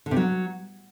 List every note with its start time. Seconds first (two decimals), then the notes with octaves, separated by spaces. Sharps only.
0.06 D3
0.11 C3
0.16 F#3